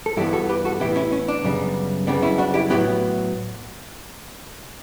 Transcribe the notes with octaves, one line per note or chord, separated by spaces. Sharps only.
A4
G2 E3 B3 E4 G4
F#4 A4
G4 B4
F#4 A4
A2 E3 B3 E4 G4
C#4 E4
C#4
D4
F#2 C#3 G3 B3
F#2 C#3 G3 B3 D4
C#4 E4
D4 F#4
E4 G4
A2 F#3 B3 E4 G4